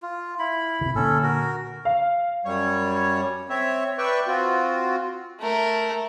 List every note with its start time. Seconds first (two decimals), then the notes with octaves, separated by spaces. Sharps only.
0.02 F4
0.39 E4 B5
0.81 C3 D#3
0.95 A#2 D3 C#4 A4
1.23 F#4 A#4
1.85 F5
2.45 F#2 G3 C#5
3.50 C4 C#5 E5
3.98 B4 D5 E5 G5 C#6
4.27 C4 F4 F#4
5.40 A3 A#4